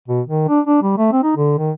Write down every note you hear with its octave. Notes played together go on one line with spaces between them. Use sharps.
B2
D#3
D4
D4
G3
A3
C4
D#4
D3
D#3